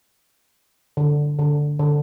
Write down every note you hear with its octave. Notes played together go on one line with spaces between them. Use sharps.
D3
D3
D3